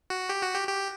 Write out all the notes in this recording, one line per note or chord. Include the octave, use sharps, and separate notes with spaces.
F#4
G4
F#4
G4
G4